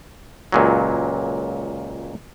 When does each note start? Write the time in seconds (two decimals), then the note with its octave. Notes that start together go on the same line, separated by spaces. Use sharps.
0.52 C#2 A#2 F#3